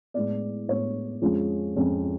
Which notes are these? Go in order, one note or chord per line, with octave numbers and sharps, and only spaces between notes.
A2 G#3 B3 D5
A2 G#3 B3 C#5
F2 F3 G#3 C#4
F2 F3 G#3 C#4